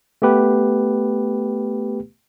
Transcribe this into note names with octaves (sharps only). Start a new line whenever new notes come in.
A3 B3 G4 B4